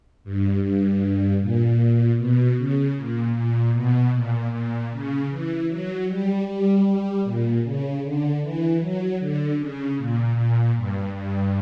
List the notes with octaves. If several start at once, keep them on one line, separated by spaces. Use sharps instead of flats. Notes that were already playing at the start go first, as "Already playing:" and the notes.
G2
G2
A#2
B2
C#3
A#2
A#2
B2
A#2
A#2
C#3
E3
F#3
G3
G3
G3
A#2
C#3
D3
E3
F#3
D3
C#3
A#2
A#2
G2
G2